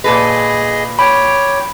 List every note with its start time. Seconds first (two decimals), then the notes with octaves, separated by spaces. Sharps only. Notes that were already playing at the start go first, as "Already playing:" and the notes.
0.04 A#2 G#4 A4 B4 D#5
0.99 C#5 G5 B5 D6